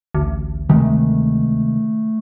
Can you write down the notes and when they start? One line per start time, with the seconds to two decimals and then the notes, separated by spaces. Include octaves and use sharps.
0.15 A1 D2
0.69 C3 D#3 G#3 A3